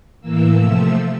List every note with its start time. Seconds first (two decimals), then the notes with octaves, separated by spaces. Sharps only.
0.21 A2 E3 A#3 E6
0.57 C3 F3 A3 E6